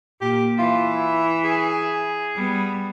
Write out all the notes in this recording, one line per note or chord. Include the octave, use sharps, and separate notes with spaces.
A#2 A#3 G4
E3 F4 E5
E4
G#4
G3 B3